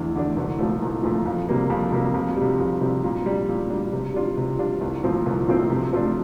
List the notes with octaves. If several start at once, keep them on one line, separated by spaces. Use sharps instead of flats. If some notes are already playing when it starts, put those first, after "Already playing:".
Already playing: E2 D3 A3 D4
D3 A3 D4
C2
A#2 F3 A3
C2
A#2 F3 A3
F2
C3 G3 A#3
F2
C3 G3 A#3
F2
C3 G3
F2
C3 G3
A#2
G3 D4
A#2
G3 D4
C3
G3 D4 F4
C3
G3 D4 F4
C2
A#2 F3 A3 C4
C2
A#2 F3 A3 C4
C3
F3 A3 D4